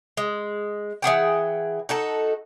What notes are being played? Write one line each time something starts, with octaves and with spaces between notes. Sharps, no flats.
G#3
E3 G#4 F#5 G5
D#4 F#4 A4